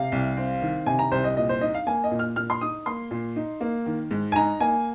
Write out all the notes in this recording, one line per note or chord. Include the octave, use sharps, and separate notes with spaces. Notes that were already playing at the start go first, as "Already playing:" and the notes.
Already playing: C3 F5
C2
C4
D#3
C3 G#5
A#5
C2 C5
D#5
A#2 D#5
C5
D#4 D#5
F5
A#3 G#5
D#5
A#2
F6
A#2 F6
C6
D#4 D#6
A#3 C6
A#2
D#4
A#3
D#3
G#2
G#5
D#4 A#5
A#3 G#5